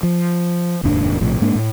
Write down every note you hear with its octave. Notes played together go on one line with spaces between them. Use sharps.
F3
F1 D#2 G#2 D4
A#1 A2 C3 F3
G#2 G#3 A#3 D4
A2